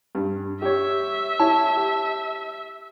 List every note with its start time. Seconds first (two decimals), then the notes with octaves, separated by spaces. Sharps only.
0.15 G2
0.62 G4 C#5 E5
1.40 E4 C#5 A5
1.77 G4